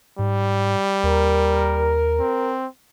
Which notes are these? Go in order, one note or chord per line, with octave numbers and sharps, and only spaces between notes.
G#2 G3
D#2 A#4
C4